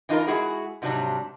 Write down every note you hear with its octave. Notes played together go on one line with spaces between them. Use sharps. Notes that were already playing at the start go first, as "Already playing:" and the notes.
E3 D#4 F4 A#4 A#5
G#3 E4 F#4 G#4
G#2 C3 F#3 G3 D4